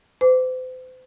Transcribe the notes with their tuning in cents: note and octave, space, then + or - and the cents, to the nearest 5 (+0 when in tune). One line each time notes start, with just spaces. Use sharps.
C5 -40 D6 -20